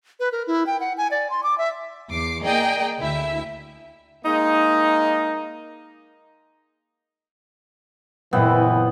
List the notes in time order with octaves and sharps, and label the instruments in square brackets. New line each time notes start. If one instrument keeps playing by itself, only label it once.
[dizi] B4
A#4
E4
G5
F#5
G#5
D5
C6
D6
E5
[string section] E2 D6 C7
A#3 G#4 A#4 D5 D#5 G5
D2 E4 E5
[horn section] G#3 A#3 D#4
[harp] F#1 A#2 E4 [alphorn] E3 [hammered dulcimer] B3 C4